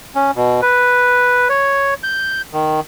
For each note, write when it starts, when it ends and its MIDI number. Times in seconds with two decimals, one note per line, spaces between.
0.15 0.31 61
0.36 0.61 47
0.62 1.48 71
1.49 1.94 73
2.03 2.41 91
2.53 2.80 51